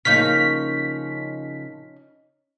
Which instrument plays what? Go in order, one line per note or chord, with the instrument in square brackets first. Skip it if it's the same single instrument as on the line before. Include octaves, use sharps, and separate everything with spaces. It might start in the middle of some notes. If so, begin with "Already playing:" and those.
[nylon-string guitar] C#3 F3 A#3 [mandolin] C#4 D#4 [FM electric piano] B6